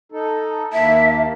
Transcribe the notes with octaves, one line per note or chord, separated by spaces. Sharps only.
D#4 A4
D#2 A#3 E5 A5